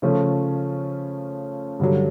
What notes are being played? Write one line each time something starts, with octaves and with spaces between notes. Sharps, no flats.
C#3 F3 A3 C#4
G2 D3 F#3